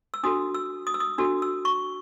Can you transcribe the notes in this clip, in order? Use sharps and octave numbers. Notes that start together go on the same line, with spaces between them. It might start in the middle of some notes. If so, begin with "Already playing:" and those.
E6
D4 F#4 A4 D#6
E6
D#6
E6
D#6
D4 F#4 A4 E6
E6
C#6